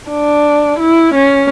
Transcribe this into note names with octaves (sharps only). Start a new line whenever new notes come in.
D4
E4
C#4